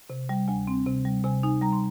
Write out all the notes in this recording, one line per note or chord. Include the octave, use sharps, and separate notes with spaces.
C3
G3
D2 G#5
C4
C3
G3
C3 G#5
D#4 G#5
G3 A#5
C6